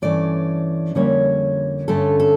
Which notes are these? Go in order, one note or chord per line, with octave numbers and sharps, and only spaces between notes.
G2 E3 A3 C#4 D5
F2 D3 G3 A#3 C#4 C#5
G2 D3 A3 C#4 A4
A4